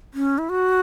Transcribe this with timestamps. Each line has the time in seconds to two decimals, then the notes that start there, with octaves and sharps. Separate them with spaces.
0.14 C#4
0.38 E4
0.49 F#4